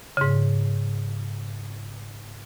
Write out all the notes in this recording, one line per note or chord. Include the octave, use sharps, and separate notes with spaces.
G#2 C#3